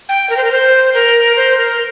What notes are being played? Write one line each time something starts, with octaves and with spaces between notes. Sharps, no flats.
G5
A#4
C5
A#4
C5
A#4
C5
A#4